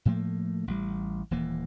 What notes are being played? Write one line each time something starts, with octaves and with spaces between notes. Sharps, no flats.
A2 F3 A3 A#3
A1 G3
D#1 E3 A#3